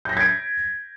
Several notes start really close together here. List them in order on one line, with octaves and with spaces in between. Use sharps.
G6 A#6 B6 G#6 D7